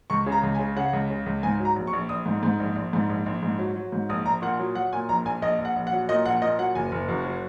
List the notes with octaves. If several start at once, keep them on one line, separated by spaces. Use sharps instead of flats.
C#2 C#6
C#3
A#5
C#2
G#5
C#3
C#3 F#5
C#2
C#3
C#2
G#2 G#5
F#3
A#5
A#1
C#6
A#1
A#1 D#6
G#2
G#2
A#1
A#1
G#2
A#1
A#1
G#2
F#3
F#3
G#2
A#1 D#6
A#1 A#5
A#2 F#5
F#3
F#3 F#5
A#2 G#5
A#1 A#5
A#1 G#5
A#1 D#5
A#1
F#5
A#1
F#5
F#3
A#2 D#5
A#1 F#5
A#2 D#5
F#3 F#5
F#1 G#5
F#1
F#2
F#3